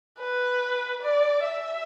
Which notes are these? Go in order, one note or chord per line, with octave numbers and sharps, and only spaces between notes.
B4
D5
E5